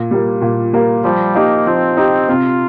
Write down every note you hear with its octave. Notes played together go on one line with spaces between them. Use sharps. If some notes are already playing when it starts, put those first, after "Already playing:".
Already playing: A#2
G3 A#3
A#2
G3 A#3
F3 G3
A#3 D#4 G4
F3 C4
D#4 G4
C3 F4